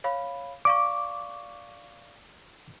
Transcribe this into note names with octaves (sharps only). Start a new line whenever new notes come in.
C#5 F5 B5
D5 F5 C#6 D6